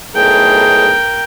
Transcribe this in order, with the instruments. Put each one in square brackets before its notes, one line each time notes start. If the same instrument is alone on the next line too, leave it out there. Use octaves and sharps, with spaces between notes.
[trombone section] B1 A2 G#4 [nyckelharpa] A#4 G5